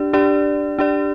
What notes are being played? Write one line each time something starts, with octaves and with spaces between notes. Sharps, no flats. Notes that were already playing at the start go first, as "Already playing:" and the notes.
Already playing: D4 G4 D5
D4 G4 D5
D4 G4 D5